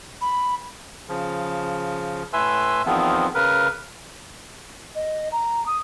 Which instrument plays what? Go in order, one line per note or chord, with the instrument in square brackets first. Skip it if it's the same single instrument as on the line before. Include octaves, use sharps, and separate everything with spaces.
[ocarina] B5
[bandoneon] C#3 F3
A2 B4 E5 G#5 C6 E6
E2 D#3 F3 B3 C4
C#3 A#4 B4
[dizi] D#5
A#5
D#6